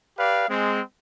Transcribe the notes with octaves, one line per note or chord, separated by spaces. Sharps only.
G4 B4 D5 F5
G#3 C4